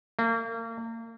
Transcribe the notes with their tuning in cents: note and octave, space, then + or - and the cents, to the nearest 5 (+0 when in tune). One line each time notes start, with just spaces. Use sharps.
A#3 -35